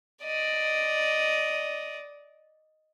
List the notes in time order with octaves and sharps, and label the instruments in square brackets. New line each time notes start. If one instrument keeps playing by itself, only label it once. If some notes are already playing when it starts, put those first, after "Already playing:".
[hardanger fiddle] D5 D#5